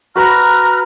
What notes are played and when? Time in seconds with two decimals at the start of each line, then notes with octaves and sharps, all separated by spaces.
0.16 F#4 B4 A#5 B5 F6 F#6